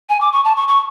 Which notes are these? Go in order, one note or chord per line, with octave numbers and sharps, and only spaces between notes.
G#5
D6
C#6
A5
C#6
C#6